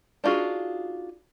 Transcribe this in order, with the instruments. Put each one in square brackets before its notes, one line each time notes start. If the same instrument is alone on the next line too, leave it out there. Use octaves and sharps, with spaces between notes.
[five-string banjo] D4 D#4 F4 F#4 G#4